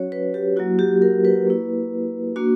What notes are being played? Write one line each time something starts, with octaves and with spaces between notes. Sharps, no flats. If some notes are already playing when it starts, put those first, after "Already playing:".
Already playing: F#3 C#4 F#4 C#5
B4
G4
F#3 A#3 E4 F#4
G4
A#4
B4
A#3 E4
A#3 D4 F#4